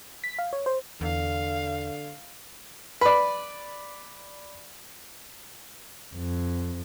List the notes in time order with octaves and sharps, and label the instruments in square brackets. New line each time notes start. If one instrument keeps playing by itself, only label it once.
[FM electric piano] B6
F5
C#5
C5
[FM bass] E2 [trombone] D3 [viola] F5
[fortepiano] B4 D5
[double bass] F2